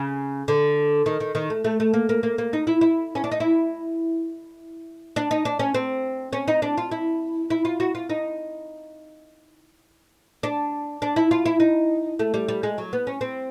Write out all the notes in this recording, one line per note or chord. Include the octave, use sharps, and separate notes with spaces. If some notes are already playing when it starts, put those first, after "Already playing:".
Already playing: C#3
D3
D#3
D#3
D#3
A3
A3
A3
A#3
A#3
A#3
A#3
D#4
E4
E4
C#4
D4
D#4
E4
D4
D#4
D4
C#4
C4
C#4
D#4
D4
F4
E4
E4
F4
F#4
F4
D#4
D4
D4
E4
F4
E4
D#4
A3
G3
G3
G#3
F#3
B3
C#4
C4